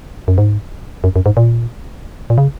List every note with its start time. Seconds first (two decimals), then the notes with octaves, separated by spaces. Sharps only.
0.28 F#2
0.38 G#2
1.04 F#2
1.16 F#2
1.26 G#2
1.37 A#2
2.30 A#2
2.38 C#3